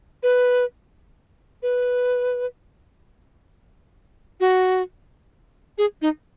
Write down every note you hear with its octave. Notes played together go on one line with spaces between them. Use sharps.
B4
B4
F#4
G#4
D#4